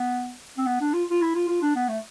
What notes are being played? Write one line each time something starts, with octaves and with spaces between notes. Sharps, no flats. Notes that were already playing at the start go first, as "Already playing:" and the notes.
Already playing: B3
C4
B3
D4
F4
F4
E4
F4
F4
D4
B3
A3